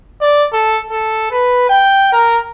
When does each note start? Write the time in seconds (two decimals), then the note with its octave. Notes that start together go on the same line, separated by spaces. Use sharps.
0.21 D5
0.52 A4
0.91 A4
1.31 B4
1.69 G5
2.12 A#4